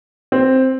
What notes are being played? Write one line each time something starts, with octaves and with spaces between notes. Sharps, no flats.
C4